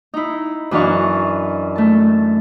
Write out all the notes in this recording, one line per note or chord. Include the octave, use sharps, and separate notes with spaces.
D#4 E4
F#2 E3 D4 D#5 F5 C#6
A3 A5